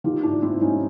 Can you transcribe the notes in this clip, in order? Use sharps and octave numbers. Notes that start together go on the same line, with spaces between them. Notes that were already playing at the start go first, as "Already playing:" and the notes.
D#3 F4 G4
G#2 D4 E4
C4 D4 E4
G3 C#4 D#4